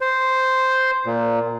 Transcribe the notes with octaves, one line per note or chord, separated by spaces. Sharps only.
C5
A#2